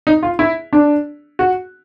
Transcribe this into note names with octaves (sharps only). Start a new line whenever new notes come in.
D#4
F4
E4
D4
F#4